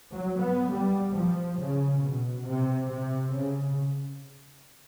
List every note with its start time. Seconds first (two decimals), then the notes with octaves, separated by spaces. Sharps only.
0.12 F#3
0.41 B3
0.70 G3
1.14 F3
1.58 C#3
2.02 B2
2.46 C3
2.91 C3
3.35 C#3